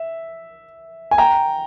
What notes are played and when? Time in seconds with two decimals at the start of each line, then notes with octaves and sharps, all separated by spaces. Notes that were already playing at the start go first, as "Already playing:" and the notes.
Already playing: E5
1.11 G#5
1.18 G5 A#5